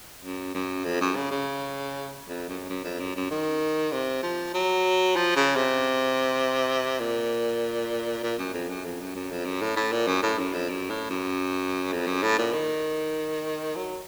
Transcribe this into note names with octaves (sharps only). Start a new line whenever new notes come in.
F#2
F#2
F2
F#2
C#3
C#3
F2
F#2
F#2
F2
F#2
F#2
D#3
C3
F3
F#3
F3
C#3
C3
A#2
A#2
F#2
F2
F#2
F2
F#2
F#2
F2
F#2
A2
A2
A#2
F#2
A2
F#2
F2
F#2
A2
F#2
F2
F#2
A2
A#2
D#3
F#3